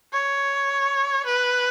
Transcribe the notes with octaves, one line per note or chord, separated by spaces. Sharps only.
C#5
B4